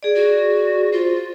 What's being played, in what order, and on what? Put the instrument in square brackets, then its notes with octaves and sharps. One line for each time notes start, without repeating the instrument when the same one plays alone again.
[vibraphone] G#4 D5
[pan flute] F#4
[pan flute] F4 [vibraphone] C5